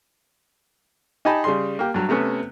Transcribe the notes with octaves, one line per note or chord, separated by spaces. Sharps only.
D#4 G4 D#5 G#5 A5 B5
C#3 G3 G#4 C6
A#3 G4
G2 F#3
C3 A3 B3 C#4